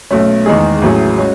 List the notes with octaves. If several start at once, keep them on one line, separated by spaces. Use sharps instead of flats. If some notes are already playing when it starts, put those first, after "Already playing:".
B1 B2 A3 C#4
E2 D#3 G#3 D#4 G#4
A1 A2 F#3 C#4 G#4
G#3 C#4 F#4